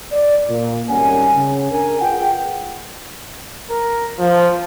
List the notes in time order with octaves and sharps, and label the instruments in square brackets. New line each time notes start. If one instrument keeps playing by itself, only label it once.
[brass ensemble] D5
A#2
G#1 G3 C#4 A#4 F#5 G#5
C#3
D4 A#4 G#5
F4 G#4 B4 F#5 G5
[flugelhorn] A#4
F3